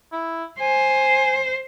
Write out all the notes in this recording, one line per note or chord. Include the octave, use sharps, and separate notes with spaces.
E4
C5 G#5